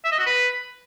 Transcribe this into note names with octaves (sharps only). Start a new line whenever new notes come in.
E5
D#5
F#4
B4